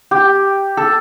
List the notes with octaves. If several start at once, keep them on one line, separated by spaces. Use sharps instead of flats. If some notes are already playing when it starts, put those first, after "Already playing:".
G4
A4